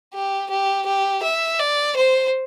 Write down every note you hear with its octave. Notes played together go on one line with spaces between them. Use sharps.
G4
G4
G4
E5
D5
C5